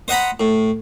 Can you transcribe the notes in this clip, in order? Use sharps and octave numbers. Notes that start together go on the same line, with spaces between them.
C5 D#5 F#5 A#5 B5
A2